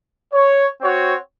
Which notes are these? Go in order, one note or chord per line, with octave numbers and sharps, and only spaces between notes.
C#5
C4 F#4 C#5